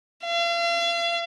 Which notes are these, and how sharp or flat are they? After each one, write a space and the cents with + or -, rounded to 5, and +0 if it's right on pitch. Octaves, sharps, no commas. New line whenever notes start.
F5 -40